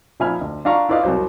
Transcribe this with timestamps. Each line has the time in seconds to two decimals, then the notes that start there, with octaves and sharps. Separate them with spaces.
0.20 A#2 F3 E5 G#5 B5 F6
0.41 D2
0.65 D4 F4 F5 A#5 C#6
0.89 E4 F4 B4 D5 D#5 F5
1.03 C2 F#3 C5